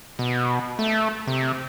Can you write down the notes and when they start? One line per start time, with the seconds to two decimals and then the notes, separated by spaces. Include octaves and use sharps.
0.19 B2
0.79 A3
1.27 C3